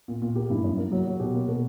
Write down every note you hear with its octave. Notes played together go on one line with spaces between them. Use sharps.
A#2
A#2
A#3 G4
G2 E4
F#2
A#3
F#3
F#3
B2 G4
A#3
B2 A#4